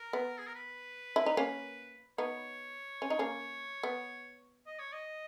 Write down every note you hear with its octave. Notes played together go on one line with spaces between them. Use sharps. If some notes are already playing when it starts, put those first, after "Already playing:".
Already playing: A#4
B3
G#4
A#4
B4
E4
D#4
A#3 C#4
B3 D#4 C#5
C#4
D#4
A#3 C#4
B3
D#5
C#5
D#5